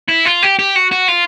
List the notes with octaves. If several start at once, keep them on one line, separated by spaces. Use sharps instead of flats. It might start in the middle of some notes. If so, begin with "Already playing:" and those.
E4
F4
G4
G4
F#4
F#4
F4